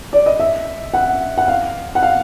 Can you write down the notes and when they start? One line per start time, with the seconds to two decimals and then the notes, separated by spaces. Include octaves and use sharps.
0.13 D5
0.26 D#5
0.39 E5
0.93 F#5
1.38 F#5
1.48 F5
1.95 F#5
2.03 F5